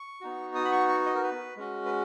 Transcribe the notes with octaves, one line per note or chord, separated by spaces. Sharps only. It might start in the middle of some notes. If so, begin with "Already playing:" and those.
Already playing: C#6
B3 D#4 F#4
D#6
B5
C#6
C#6
D#5
A#4
B4
G#3 C#4 F#4
B4